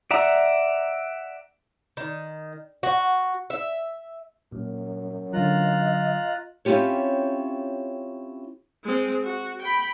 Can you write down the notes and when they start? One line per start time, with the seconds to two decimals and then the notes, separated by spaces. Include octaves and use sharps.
0.11 D5 E5 F#5 A#5
1.97 D#3
2.83 F#4
3.50 E5
4.52 F#2 A#2
5.33 D3 F#3 F4 D#5 A#5 F#6
6.65 C4 C#4 E4 F4 G4 C#5
8.84 G#3 C4
9.23 F#4
9.61 G5 B5